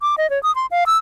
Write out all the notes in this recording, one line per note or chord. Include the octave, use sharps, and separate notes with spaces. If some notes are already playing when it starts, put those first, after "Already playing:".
D6
D#5
C#5
D#6
C6
F5
E6